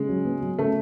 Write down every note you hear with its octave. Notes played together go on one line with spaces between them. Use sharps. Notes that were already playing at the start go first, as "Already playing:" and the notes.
Already playing: C#3 G#3
F#3
B3
F#3
C#3 A3